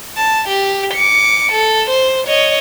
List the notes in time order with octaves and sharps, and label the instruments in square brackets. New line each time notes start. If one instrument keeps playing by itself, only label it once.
[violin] A5
G4
D6 C#7
A4
C5
C#5 D#5